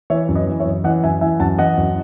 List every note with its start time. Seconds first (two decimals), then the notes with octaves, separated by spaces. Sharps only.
0.10 E3 C#5 E5
0.29 F#2
0.35 B4 D#5
0.47 E3
0.60 C#5 E5
0.65 F#2
0.84 E3 D#5 F#5
1.04 F#2 E5 G#5
1.21 E3 E5 G#5
1.40 F#2 F#5 A5
1.58 E3 D#5 F#5
1.77 F#2